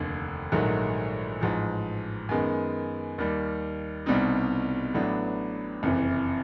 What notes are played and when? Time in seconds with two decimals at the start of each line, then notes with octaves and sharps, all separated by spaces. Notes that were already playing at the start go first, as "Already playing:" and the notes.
Already playing: F1 D#2 D3
0.52 A#1 G#2 D#3 F#3 A3
1.41 A1 G#2 F3
2.29 F#2 D#3 G#3 B3
3.18 D#2 D#3 G3
4.06 C2 B2 G3 C4 D#4
4.94 A1 A2 F#3 B3 D4
5.83 F#1 F2 C3 E3